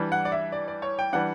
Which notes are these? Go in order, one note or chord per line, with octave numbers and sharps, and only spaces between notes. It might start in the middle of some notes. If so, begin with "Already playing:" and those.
Already playing: E3 G3 D4
F#5
D5
E5
D5
D5
C#5
G5
E3 G3 D4 F#5